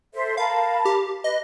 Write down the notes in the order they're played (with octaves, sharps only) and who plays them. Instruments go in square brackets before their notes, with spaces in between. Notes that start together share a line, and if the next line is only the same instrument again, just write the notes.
[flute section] A4 C5 E5
[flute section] A#4 A5 B5 [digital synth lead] F5
[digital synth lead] G4
[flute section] B4 [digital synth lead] D#5